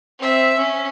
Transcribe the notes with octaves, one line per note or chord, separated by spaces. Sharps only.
C4 E5
C#4